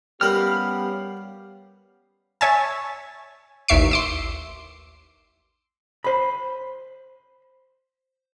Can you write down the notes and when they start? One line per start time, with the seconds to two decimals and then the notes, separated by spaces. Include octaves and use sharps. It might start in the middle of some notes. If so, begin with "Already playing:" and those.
0.21 G3 B3 C#4 G4 A#4 F5 B5 F6
2.41 C#5 E5 G#5 A5
3.68 A1 D#2 E5 C#6 C7 D7
3.91 C6 D6 E6
6.04 C5 B5